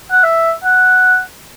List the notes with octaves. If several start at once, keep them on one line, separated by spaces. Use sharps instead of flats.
F#5
E5
F#5